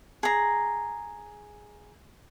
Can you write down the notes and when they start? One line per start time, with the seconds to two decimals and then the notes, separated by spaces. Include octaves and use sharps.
0.23 G#4 A#5